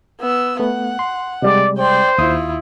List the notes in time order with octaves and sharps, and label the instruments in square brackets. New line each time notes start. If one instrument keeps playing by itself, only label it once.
[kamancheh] B3 E6
[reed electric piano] A3 B3 [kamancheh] F#5
[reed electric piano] C6
[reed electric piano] C3 G3 G#3 [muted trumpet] D5
[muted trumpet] C5 [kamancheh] D5 G5
[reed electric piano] D#2 D#6 [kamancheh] E4 F4